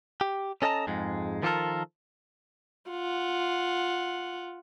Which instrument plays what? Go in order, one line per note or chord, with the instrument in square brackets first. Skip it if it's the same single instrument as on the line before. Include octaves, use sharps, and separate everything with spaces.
[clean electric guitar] G4
C#4 A4 D#5 E5 A5 A#5
F2 G#2 G#3
D#3 F3 F4 G4 A4 A#4
[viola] F4 F#5